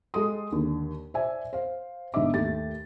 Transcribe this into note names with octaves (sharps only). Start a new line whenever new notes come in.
G#3 G4 A4 C6 D#6
D#2 D3
C5 D5 E5 G#5
C5 F5
G1 G#2 D4 D#5 E5 D6
D#2 A3 G4 A6